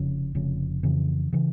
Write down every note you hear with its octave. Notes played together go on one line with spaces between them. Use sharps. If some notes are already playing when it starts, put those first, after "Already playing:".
Already playing: F1 F2 C#3
F1 F2 C#3
F2 C#3 E3
C#3 E3